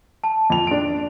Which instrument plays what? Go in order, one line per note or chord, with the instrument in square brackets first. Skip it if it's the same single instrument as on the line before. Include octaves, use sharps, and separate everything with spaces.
[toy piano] A5
[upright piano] F2 F7
D4 D7